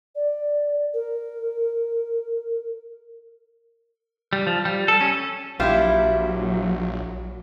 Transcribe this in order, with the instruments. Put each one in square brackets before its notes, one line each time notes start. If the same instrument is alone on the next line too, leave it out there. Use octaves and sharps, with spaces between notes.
[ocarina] D5
A#4
[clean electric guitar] G3
F3
G3
A4
C#4
[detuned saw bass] A#1 [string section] F#3 [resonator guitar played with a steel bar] G3 E4 [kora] F4 G4 E5